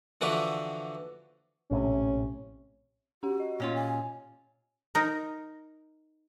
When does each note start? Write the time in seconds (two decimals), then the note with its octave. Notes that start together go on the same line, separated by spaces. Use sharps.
0.21 D3 E3 F3 D4 F#4 B4
1.71 A#1 A2 C3 C#4
3.23 C#4 F#4 G4 F#5
3.40 D#5
3.60 A#2 C#4 F4
3.75 G#5
4.95 D#4 A#4